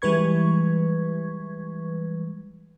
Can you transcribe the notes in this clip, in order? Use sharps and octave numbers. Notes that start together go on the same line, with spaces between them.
E3 G3 G#3 B4 C#6 G#6